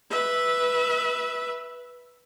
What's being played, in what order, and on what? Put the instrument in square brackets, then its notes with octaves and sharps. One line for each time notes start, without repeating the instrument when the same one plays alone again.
[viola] B4 E5